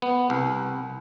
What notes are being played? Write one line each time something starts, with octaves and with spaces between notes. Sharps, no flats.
B3
C2